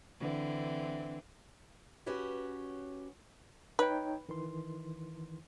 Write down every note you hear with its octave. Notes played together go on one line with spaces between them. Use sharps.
D3 E3 C4
C#4 F#4 G4 B4 C#5
D#4 B4 C#5 G5
D#3 E3 C6